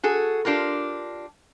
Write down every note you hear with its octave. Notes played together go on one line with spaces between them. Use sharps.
F#4 G#4 A4
D4 F4 G4 A#4